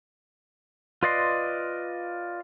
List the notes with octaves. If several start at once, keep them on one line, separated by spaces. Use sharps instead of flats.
F4 B4 D5 D#5 C6